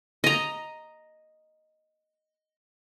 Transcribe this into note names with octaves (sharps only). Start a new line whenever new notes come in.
D#5 A#5